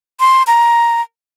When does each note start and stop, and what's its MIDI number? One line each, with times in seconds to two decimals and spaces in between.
0.20 0.43 84
0.47 1.01 82